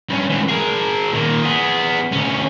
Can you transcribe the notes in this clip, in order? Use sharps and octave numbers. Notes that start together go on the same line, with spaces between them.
G2 C#4
G#2 E3
G#4 A#4
A#2 D#3
B3 G#4
D2 C#4